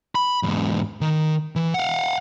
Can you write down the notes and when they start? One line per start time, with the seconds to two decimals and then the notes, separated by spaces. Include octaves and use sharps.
0.15 B5
0.43 E2 G#2
1.01 D#3
1.56 E3
1.74 F5 F#5